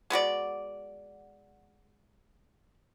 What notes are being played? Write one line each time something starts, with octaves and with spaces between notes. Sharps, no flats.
G#3 B3 F#4 D5